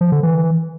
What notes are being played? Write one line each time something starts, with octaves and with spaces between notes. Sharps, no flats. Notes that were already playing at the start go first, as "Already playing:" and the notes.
F3
D3
E3